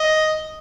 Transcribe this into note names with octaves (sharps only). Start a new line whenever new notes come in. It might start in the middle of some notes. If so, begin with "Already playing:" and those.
Already playing: D#5